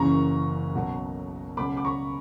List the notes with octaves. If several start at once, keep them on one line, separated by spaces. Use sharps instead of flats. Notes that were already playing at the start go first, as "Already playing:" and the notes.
Already playing: F#1 F#2 C#3 E3 A#5 C#6
B1 B2 F#3
C#2 B2 F#3 B5 D6
D6
A#5 C#6